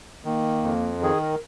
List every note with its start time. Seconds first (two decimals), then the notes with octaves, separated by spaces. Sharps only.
0.25 D#3 A#3
0.63 F2
1.01 D#3 G#4
1.21 A#4